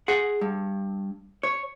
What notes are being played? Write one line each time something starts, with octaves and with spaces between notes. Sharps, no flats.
G#4 F#5
G2
C#5